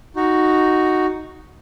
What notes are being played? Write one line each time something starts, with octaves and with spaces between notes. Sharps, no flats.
D#4 F#4